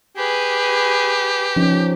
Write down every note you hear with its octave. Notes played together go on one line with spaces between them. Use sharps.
G4 G#4 B4
F3 C#4 D#4